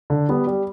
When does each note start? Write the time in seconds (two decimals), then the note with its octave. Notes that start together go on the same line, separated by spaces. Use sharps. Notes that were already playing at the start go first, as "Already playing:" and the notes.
0.10 D3
0.29 G3 B3
0.47 G3